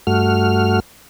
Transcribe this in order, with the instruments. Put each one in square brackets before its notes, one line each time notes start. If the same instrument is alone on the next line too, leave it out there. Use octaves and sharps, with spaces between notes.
[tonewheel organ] G2 A3 F#4 F6